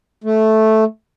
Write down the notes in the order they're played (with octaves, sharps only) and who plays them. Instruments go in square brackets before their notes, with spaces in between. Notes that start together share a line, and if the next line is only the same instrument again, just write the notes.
[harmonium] A3